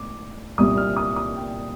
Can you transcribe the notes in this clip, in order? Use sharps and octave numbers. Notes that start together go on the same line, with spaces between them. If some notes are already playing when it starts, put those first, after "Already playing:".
Already playing: A2 D6
C2 A#2 G3 D#6
F6
D#6
D#6
G5